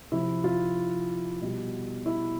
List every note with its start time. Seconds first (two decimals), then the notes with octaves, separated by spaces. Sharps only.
0.12 C3 F3 E4
0.44 F4
1.42 B2 G3
2.06 E4